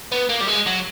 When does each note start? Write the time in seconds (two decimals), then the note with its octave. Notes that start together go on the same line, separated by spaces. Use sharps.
0.12 B3
0.30 A#3
0.41 G3
0.48 G#3
0.67 F#3